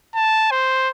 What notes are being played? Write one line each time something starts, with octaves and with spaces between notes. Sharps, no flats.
A5
C5